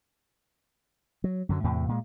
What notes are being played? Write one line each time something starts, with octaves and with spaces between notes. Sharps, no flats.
F#3
F#2 D3 F#3
E2 A2 C3
A#2 G#3